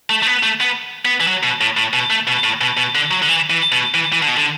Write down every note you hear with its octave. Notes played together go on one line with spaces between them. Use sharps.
A3
A3
B3
A3
B3
B3
E3
F#3
B2
A2
A2
B2
A3
B2
A2
B2
B2
D3
F#3
D3
E3
E3
B2
E3
E3
D3
B2
D3